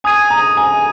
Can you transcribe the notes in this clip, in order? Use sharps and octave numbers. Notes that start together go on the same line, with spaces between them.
G#5 D#6 G#6 D#7
A#5
G#5